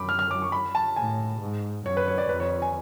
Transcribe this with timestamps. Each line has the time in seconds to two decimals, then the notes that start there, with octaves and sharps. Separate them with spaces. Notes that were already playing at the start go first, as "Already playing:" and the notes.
Already playing: F#2 B5 D6
0.09 F6
0.19 F6
0.31 D6
0.42 C#6
0.52 B5
0.75 A5
0.96 A2 G#5
1.41 G#2
1.85 F#2 C#5
1.97 B4
2.08 C#5
2.18 D5
2.29 F2 B4
2.40 C#5
2.62 G#5